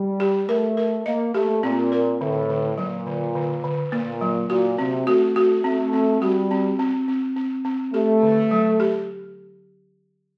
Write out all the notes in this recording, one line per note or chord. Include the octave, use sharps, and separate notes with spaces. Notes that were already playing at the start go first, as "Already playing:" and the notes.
Already playing: G3
G4
A3 A#4
A#4
A#3 D#5
A3 G4
A#2 C4
A#4
A2 D3
D3
A#2 F#3
D3
D3
D3
A#2 A#3
F#3
A#2 F#4
C3 C4
A3 F#4
F#4
A3 C4
C4
G3 F#4
C4
C4
C4
C4
C4
A3 G4
D3
F#3
G4